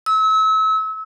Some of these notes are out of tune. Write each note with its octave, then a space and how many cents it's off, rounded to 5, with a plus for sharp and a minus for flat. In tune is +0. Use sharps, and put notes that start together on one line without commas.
E6 -35